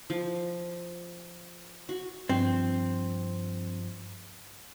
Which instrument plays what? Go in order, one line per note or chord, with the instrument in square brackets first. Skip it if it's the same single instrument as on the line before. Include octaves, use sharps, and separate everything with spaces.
[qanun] F3
F#4
[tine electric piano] G2 F3 [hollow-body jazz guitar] C4